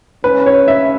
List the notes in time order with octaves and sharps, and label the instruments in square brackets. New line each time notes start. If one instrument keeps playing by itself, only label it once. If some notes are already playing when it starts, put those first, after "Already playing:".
[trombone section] C#3 G#3 C#4 [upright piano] B4
[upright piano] C#5
E5